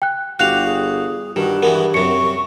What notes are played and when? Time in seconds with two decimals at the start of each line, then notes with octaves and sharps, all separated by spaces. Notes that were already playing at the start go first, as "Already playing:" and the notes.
0.02 G5 F#6
0.39 G1 F#4 G4 F5 F#6 F7
0.67 G#4
1.36 G2 D#3 F#4
1.63 E3 G#3 B3 A#4
1.94 F#2 C3 C#6 C#7